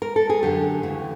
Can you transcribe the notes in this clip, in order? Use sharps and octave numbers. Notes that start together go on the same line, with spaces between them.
A#4
A4
G#4
F#2 D3 G4
D2 C#3 E3